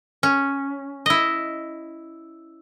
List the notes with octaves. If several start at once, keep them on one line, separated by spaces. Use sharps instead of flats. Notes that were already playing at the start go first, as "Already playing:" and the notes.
C#4
E4 D#5